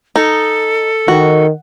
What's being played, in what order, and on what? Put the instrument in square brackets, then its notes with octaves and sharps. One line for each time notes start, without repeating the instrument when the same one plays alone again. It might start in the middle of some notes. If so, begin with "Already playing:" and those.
[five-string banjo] D#4 [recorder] A4
[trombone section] D#3 [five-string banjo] F#4